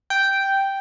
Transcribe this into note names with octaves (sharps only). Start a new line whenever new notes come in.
G5